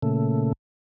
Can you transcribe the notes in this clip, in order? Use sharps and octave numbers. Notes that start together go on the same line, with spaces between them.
A#2 C#3 A3